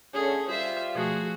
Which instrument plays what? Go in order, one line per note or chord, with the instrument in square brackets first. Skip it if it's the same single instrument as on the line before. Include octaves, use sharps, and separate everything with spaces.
[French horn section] A2 D3 C#4 [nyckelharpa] G#4 A4
[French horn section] G3 F4 [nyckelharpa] C5 E5
[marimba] B2 F3 A3 [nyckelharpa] F#4 G#4